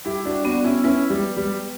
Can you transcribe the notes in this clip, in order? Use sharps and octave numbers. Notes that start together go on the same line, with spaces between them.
G3 E4 G4
D4 F#4
B3 D4 F#4
C#4 E4
C#4 E4 B4
G3
B4
G3